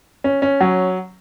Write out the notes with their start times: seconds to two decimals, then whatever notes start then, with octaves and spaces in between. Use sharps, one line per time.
0.24 C#4
0.42 C#4
0.61 F#3